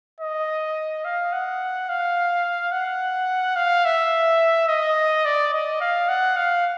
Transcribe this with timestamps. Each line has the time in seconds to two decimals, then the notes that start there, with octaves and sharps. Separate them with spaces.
0.20 D#5
1.05 F5
1.33 F#5
1.89 F5
2.72 F#5
3.56 F5
3.85 E5
4.68 D#5
5.25 D5
5.53 D#5
5.81 F5
6.09 F#5
6.36 F5